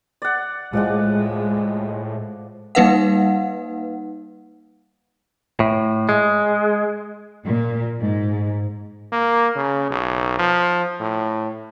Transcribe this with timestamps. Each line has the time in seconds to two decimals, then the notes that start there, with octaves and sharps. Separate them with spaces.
0.22 D5 F#5
0.73 A2 F3 G#3 D5 F#5
2.75 G3 A#3 D#4 B4 F5 F#5
5.60 A2
6.09 G#3
7.46 A#2
8.01 G#2
9.12 A#3
9.56 C#3
9.91 B1
10.39 F3
11.00 A2